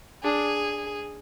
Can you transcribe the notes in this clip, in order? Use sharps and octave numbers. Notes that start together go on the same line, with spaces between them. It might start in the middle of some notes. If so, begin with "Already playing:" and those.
D4 G#4